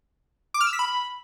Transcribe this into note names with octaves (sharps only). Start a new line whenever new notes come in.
D6
F6
E6
B6
B5